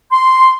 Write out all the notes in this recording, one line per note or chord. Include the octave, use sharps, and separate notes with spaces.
C6